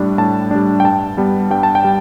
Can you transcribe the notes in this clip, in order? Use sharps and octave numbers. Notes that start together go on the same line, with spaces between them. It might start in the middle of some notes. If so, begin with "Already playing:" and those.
Already playing: A2 G3 D4
A2 A5
G3 D4
G5
G2 A5
G3 B3
G2 G5
A5
G5
G3